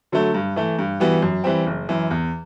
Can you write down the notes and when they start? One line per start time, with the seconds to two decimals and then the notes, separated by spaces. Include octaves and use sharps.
0.12 D3 F#3 A3
0.34 G2
0.56 E3 A3
0.79 G2
1.00 E3 G3 B3 F#4
1.22 F#2
1.44 E3 G3 C4
1.67 F#1
1.89 F#2 E3
2.11 E2